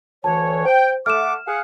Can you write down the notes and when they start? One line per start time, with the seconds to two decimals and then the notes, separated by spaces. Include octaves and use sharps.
0.24 D2 E3 C#5 A5
0.66 C5 G5
1.06 A3 F#5 D6 F6 E7
1.47 G#4 F5 F#5